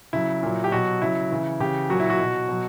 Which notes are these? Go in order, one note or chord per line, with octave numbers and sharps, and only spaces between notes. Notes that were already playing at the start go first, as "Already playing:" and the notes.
C#3 F#3 E4
A#2 F#3
G4
B2 F#3 F#4
C#3 F#3 E4
C#3 E3
C#3 E3 G4
A#2 F#3 F#4
E4
F#4
B2 F#3
B2 F#3